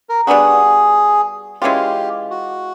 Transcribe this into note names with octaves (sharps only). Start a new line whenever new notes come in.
A#4
G3 B3 D4 F#4 G#4
E3 G#3 C#4 F4 G4
F#4